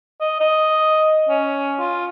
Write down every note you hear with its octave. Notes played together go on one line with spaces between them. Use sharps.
D#5
D#5
C#4
F4